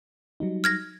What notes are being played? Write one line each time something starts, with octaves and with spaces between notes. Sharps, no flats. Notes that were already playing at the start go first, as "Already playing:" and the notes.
F#3 G3 D#4
F6 G#6 A#6